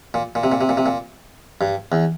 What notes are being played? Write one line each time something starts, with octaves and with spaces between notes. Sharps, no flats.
A#2
A#2
C3
A#2
C3
A#2
C3
A#2
G2
E2